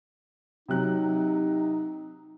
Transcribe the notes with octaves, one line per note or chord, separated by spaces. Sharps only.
C3 F#3 D#4 F#6